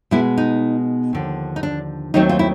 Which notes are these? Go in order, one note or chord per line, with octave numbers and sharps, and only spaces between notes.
B2 G#3 B3 E4
D#4
D#2 D3 F3
D#4
D4
D#2 D#3 F#3 A3 C4 D#4
F4
E4